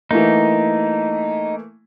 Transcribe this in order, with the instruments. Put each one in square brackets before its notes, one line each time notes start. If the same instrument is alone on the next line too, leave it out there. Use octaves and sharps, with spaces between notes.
[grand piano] E3 A3 A#3 [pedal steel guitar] D#4